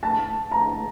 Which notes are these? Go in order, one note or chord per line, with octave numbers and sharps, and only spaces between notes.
A5
A#5